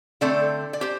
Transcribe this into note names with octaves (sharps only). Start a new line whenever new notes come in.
D3 A3 C4 A4 D5
D5
G4 C5